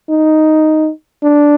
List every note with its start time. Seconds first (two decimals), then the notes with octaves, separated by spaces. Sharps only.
0.09 D#4
1.23 D4